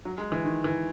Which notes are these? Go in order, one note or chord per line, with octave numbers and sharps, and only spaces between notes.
F#3
G#3
E3
D#3
E3